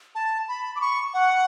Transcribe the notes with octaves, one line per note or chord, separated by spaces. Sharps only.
A5
B5
D6
C#6
F#5